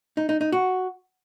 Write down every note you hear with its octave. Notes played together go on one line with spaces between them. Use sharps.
D#4
D#4
D#4
F#4